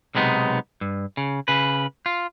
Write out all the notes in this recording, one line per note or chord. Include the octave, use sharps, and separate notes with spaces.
B1 C3 G#3 B3 D#4
G2
C#3
C#3 B4
F4